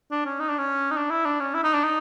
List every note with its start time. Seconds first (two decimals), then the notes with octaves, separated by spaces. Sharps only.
0.11 D4
0.26 C#4
0.40 D#4
0.49 D4
0.58 C#4
0.91 D#4
0.97 D4
1.10 E4
1.25 D4
1.40 C#4
1.54 E4
1.64 D#4
1.74 D4
1.84 D#4